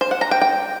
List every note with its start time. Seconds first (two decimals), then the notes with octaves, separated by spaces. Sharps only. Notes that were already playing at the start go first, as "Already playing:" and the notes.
0.01 C5
0.11 F#5
0.21 A#5
0.31 G5
0.42 G5